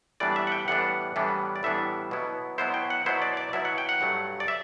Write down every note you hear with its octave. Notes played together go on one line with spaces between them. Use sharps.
A2 E3 G3 B3 D4 D5
E5
F#5
G5
A2 E3 G3 B3 D4 F#5
A2 E3 G3 B3 D4
D5
A2 E3 G3 B3 D4 E5
B2 F#3 B3 E4
B2 F#3 B3 E4 C5
G5
F#5
B2 F#3 B3 E4 C5
D5
D5
B2 F#3 B3 E4 E5
F#5
G5
F#5
G2 F#3 A3
D5
E5